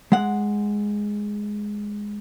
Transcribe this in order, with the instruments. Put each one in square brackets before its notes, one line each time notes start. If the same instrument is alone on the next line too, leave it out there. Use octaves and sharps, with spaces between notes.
[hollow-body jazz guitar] G#3 F#5